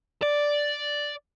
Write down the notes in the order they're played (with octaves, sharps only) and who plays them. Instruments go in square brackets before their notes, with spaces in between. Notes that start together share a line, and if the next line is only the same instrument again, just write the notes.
[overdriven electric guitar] D5